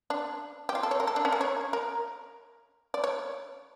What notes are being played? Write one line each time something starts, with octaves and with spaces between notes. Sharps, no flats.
D4
G4
F4
A4
C#5
A#4
A4
D4
C#4
A#4
C#5
A#4
D5
C#5